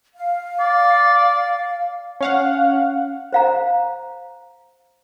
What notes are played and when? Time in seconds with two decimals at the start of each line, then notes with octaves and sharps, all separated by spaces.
0.15 F5
0.60 D5
2.21 C#4 F5 F#5
3.33 C5 F5 A#5